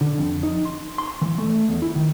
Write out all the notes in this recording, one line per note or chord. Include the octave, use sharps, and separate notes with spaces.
D3
F2
D#4
C6
C6
E3
A3
E2
E4
D#3